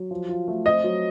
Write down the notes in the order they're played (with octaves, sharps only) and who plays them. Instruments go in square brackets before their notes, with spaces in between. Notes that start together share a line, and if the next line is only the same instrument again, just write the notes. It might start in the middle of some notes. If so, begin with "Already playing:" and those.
Already playing: [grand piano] F#3
F3
F4
A3
[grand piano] C4 [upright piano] D#5
[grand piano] F#3